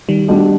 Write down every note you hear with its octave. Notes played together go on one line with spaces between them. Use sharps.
D#3 G3
B2 G3 D4 G4